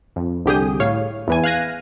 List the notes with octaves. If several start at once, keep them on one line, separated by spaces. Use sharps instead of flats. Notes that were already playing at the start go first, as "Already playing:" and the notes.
F2
C2 D3 G4 G#4 D#6 G6
A2 C#5 F5
E2 E3 G#5
F5 F6 F#6 G#6 A#6 D#7